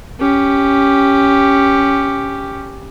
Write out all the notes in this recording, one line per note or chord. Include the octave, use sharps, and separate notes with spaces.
C#4 G4